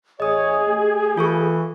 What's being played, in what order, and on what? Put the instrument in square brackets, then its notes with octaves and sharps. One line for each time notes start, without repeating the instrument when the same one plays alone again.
[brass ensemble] A1 C#5 [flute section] G#4 [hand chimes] D#5 D#6
[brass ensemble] A3 G4
[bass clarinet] E3 [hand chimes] F4 A4 C#6